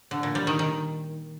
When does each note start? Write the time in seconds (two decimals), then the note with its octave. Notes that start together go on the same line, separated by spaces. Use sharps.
0.11 D3
0.23 A#2
0.35 G3
0.47 D#3
0.59 D#3